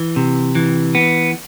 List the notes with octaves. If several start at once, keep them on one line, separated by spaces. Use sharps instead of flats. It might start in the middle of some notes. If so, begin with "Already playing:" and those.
Already playing: E3
C3
E3
B3